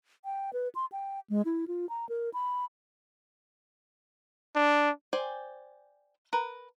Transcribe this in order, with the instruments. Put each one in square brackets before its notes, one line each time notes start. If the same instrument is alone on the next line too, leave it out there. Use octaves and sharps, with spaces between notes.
[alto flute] G5
B4
C6
G5
G#3
E4
F4
A#5
A#4
B5
[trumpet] D4
[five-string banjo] C5 D5 G5 G#5
A#4 B4